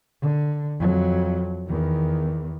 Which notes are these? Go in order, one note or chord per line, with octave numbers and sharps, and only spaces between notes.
D3
F2 F#3
E2 D#3